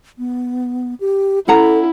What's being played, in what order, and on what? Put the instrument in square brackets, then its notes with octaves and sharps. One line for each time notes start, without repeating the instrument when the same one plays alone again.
[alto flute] B3
G4
[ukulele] C#4 F#5 A#5 [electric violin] E4 [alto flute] A4